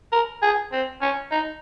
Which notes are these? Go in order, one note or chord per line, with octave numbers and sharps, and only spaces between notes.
A#4
G#4
C4
C#4
D#4